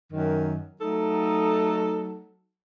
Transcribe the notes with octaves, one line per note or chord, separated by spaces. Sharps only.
F#2 D#3
F#3 A3 D#4 A4